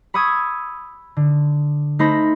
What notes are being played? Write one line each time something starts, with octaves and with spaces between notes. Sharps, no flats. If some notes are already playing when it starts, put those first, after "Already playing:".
B5 C#6 D#6 E6 G#6
D3
A3 D#4 C5 B5 A#6